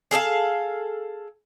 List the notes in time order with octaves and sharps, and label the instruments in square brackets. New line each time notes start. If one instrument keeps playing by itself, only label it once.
[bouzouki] G#4 A4 D5 F5